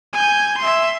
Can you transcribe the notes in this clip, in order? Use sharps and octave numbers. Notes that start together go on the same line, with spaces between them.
G#5 G6
E5 C6